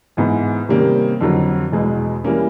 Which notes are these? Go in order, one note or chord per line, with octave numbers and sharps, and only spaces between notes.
G#2 E3 G#3 B3
C3 D#3 G3 A#3 C#4
F2 D3 F#3
E2 B2 G#3
E3 G3 A#3 C#4